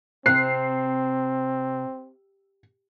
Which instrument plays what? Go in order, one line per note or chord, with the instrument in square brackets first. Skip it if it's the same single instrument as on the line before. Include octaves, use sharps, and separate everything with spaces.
[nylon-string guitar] C3 [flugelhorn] C4 [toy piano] C5 [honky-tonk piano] C7